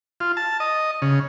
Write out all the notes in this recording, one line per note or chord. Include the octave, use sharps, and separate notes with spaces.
F4
A5
D#5
C#3